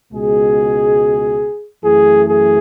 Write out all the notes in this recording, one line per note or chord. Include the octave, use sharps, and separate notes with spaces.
C#2 B2 G#3 G#4
F#2 E3 A3 G#4
G#4